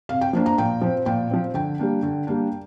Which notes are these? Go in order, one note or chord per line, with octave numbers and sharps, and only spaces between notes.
C3 F5
G5
F3 A#3 D4
A#5
A#2 G5
F3 C4
A#2 G5
F3 C4
D3 G5
G3 A#3 D4
D3
G3 A#3 D4